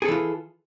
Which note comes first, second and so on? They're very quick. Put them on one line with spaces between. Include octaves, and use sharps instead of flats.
G#4 A4 E3 F4